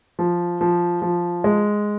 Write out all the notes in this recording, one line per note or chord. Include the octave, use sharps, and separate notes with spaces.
F3
F3
F3
G#3